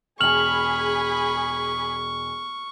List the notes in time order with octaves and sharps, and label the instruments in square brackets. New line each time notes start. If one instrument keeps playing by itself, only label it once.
[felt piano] E1 G#5 [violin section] G#4 B5 [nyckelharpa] C#6 [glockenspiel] F6 F7 F#7